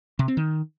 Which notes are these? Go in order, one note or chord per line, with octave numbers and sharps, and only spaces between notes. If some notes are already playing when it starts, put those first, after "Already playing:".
C3
C4
D#3